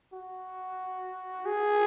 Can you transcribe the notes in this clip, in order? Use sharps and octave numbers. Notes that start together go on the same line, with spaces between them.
F#4
G#4